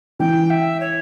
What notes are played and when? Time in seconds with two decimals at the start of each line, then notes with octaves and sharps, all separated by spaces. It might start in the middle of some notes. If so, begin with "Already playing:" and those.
0.20 E3 G5
0.50 E5
0.80 C#5